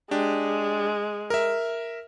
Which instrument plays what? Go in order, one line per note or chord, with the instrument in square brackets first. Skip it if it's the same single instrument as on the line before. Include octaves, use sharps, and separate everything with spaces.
[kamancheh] G#3 [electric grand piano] D4 G4
[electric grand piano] A#4 E5